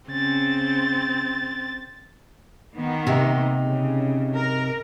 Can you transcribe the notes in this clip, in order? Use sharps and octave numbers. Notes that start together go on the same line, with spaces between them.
C#3 C4 A6
D#3 A#3 B3
C3 D#4
C#3
A#4